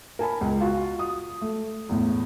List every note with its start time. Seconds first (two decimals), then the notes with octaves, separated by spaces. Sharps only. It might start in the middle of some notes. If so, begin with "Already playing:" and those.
0.19 A#4 G#5 A5 B5
0.41 C#2
0.61 F4 F#4
0.99 D#6
1.42 A3
1.89 E2 A2